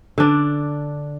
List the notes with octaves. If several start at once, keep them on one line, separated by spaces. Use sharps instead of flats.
D3 D4